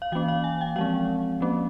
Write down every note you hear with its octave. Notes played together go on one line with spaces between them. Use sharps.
F5
E3 A#3 C#4 G5
F5
G#5
G5
F3 G#3 C4 F5
F3 A#3 C#4